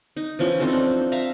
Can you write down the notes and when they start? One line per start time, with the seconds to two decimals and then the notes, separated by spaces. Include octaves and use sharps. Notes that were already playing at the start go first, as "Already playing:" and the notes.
0.16 D#4
0.39 E3 F3 C#4
0.60 C4 D#4 F4 A4
0.72 D4 D#4
1.12 E5 F5 A#5